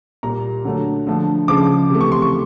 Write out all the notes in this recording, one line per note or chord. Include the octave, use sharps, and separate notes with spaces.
A#2 G3 A#5
D3 F#3 A3
D3 F3 A3
C#3 F3 G#3 D6
C3 E3 A3
C#6
C6
C#6